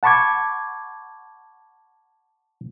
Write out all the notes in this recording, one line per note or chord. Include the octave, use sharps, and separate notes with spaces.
F#5 A5 B5 C#6 D6 G#6